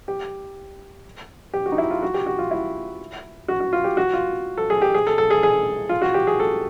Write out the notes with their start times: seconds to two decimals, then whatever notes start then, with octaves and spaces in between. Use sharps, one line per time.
0.08 G4
1.54 G4
1.66 F#4
1.72 D#4
1.78 E4
1.91 F4
2.03 F#4
2.14 G4
2.26 F#4
2.39 F4
2.51 E4
3.48 F#4
3.60 F#4
3.73 F4
3.84 G4
3.97 F#4
4.13 F4
4.58 A4
4.70 G#4
4.82 G4
4.94 G#4
5.07 A4
5.18 A4
5.30 G#4
5.43 G#4
5.89 F4
6.02 F#4
6.14 G4
6.27 G#4
6.40 A4